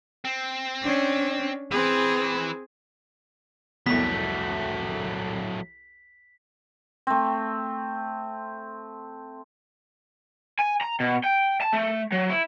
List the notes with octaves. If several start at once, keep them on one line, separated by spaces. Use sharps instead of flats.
C4
C#4 D4
E3 C4 G#4 B4
C2 F2 F#3 A3 B3 B6
A3 C4
G#5
A#5
B2
G5
A5
A3
F#3
E4